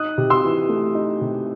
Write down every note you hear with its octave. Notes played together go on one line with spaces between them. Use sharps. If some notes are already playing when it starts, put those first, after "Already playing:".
Already playing: D#4 D#6 F#6
C3
C6 E6
E3
A3
D#4
C3